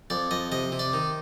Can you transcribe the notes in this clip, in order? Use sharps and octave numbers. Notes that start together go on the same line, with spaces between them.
F2 D5
F2 D#5
C3 D#5
C3
D5
D#3